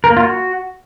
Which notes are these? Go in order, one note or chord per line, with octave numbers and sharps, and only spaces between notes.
A#4
A#3
F4
F#4